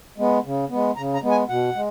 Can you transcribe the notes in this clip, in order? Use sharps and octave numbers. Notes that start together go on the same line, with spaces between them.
G#3 B3
C#3
G#3 B3
C#3 A#5
A#5
G#3 B3
G#5
B2 F#5
G#3